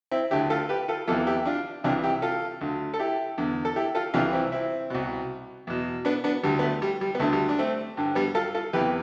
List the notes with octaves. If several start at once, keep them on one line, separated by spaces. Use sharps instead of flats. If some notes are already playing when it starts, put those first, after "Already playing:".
C4 E4
D2 D3 E4 G4
F4 A4
G4 B4
F4 A4
E2 C3 E3 F4 A4
E4 G4
D4 F4
C2 C3 E3 D4 F4
E4 G4
F4 A4
D2 D3
A4
E4 G4
E2 D3
A4
E4 G4
F4 A4
C2 C3 E3 D4 F4
C4 E4
C4 E4
C2 B2
E2 B2
B3 D4
B3 D4
D2 D3 G3
B3
A3
G3
G3
B3
D2 D3 A3
G3
D4
A3 C4
G2 D3
G3 B3
F4 A4
F4 A4
E2 C3 E3 G4 B4